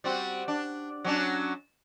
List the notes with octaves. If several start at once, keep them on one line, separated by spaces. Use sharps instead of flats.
G3 C4 F#4
D4
F#3 C#4 D4